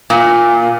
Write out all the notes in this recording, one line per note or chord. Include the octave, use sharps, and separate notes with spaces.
A#2